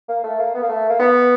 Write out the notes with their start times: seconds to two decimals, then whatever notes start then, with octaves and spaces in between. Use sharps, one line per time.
0.09 A#3
0.24 A3
0.39 A#3
0.55 B3
0.63 A#3
0.69 A3
0.89 A#3
0.99 B3